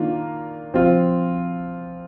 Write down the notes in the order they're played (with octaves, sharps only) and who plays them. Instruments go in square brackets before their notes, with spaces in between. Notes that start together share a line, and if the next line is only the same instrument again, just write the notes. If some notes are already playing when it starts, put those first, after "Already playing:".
Already playing: [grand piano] D#3 A#3 D4 F4
F3 C4 F4